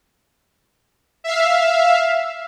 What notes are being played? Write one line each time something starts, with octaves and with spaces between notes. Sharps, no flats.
E5 F5